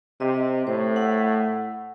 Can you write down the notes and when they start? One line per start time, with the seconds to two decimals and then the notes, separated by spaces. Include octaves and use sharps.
0.20 C3 D#5
0.67 A2 C5
0.96 F#5 E6